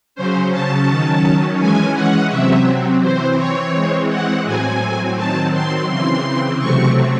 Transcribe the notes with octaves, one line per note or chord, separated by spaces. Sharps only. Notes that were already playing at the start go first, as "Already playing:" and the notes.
C#3 F#3 C#4 C5
A5
D#3 F#3 C#4
E3 G#3 C#4 G#5
F#5
C3 F#3 C4 E5
E3 C4 C5
C#5
E3 G#3 C4
F#5
A2 F#3 C4 G#5
D#3 F#3 C4 A5
C6
C#3 E3 C4 C6
C3 F#3 A3 C4 C#6